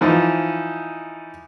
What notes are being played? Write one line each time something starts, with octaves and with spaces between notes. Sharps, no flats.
E3 F3 D#4